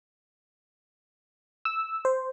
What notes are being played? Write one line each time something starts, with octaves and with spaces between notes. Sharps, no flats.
E6
C5